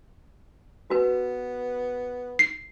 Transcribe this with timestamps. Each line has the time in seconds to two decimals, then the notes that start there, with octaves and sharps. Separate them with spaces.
0.90 B3 F#4 B4
2.39 C7